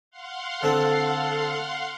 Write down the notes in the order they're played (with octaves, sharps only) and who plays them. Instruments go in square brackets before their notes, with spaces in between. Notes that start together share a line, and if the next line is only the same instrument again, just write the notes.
[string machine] F5 F#5 C6
[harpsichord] D3 C4 A5 [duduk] A4